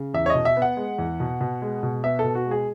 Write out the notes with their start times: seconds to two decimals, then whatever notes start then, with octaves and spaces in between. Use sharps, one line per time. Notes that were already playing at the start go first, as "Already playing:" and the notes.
Already playing: C#3
0.14 E2 E5
0.26 C#5
0.30 D#5
0.35 B2
0.45 E5
0.57 B3
0.62 F#5
0.77 G#3
0.98 E2
1.20 B2
1.41 B2
1.62 G#3
1.83 B2
2.04 B3 E5
2.19 A4
2.24 B2
2.35 F#4
2.46 G#3
2.51 G#4